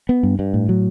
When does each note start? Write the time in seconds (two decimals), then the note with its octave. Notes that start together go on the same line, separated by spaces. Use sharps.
0.09 B3
0.23 G2
0.39 G2
0.54 A2
0.69 F#3